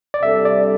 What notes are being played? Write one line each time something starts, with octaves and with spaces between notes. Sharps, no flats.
D5
C3 G3 D4 A4 E5
D5